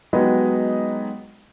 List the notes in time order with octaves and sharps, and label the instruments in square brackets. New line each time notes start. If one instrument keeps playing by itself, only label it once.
[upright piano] F#3 G#3 B3 D#4 F#4 G4